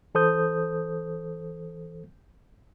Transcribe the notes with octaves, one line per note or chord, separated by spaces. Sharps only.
E3 A4 C5 D#6 G6